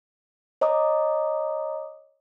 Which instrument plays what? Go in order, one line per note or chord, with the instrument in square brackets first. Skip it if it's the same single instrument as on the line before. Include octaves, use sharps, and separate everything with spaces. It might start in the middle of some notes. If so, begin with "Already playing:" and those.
[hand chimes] C#5 D#5 A#5 D6 D#6